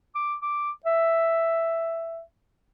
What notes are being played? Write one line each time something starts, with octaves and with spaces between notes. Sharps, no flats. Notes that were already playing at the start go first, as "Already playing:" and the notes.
D6
D6
E5